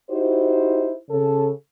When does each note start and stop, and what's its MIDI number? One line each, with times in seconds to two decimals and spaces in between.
0.10 0.93 63
0.10 0.93 64
0.10 0.93 66
0.10 0.93 67
0.10 0.93 72
1.09 1.49 49
1.09 1.49 69